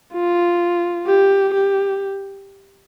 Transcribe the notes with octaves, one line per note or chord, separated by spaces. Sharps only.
F4
G4
G4